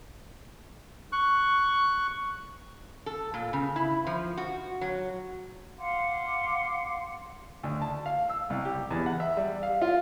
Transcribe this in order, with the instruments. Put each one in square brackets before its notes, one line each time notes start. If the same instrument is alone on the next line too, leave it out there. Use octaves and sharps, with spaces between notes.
[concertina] C#6 F#6
[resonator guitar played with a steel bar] A4
A#2
C#3
E4
F3
F#4
F#3
[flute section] F5 F#5 C6 D6
[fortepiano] D2
A5
F5
E6
C2
G4
E2
F#5
E5
G3
F5
F4